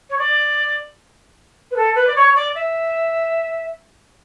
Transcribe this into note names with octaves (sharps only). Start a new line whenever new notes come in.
C#5
D5
B4
A4
B4
D5
C#5
D5
E5